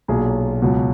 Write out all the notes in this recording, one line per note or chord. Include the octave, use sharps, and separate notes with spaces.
B1 A#2 F#3 G#4
C#2 B2 F#3